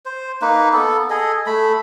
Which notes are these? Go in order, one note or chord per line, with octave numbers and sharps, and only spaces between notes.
C5
A#3 D#4 B4
B3 A4
G#4 A4 D#5
A3 B5